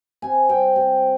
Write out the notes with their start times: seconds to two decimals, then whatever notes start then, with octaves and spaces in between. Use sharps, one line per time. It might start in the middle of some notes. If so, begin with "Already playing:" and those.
0.22 C3 G#5
0.49 G3 C4 G5
0.76 C3